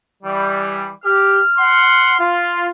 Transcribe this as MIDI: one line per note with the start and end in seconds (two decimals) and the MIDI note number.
0.24 0.89 52
0.24 0.89 55
1.03 1.40 67
1.03 2.46 89
1.59 2.15 78
1.59 2.15 84
2.20 2.70 65